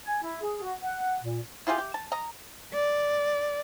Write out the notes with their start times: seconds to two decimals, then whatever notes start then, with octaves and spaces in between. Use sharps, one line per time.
0.06 G#5
0.23 E4
0.41 G#4
0.61 F#4
0.82 F#5
1.23 A#2
1.67 E4 F4 G4 G#4
1.78 G4
1.94 A5
2.12 D#5 A#5
2.73 D5